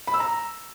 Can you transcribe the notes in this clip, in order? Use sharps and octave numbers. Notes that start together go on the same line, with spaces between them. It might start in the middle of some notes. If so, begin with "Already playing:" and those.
B5
E6
A#5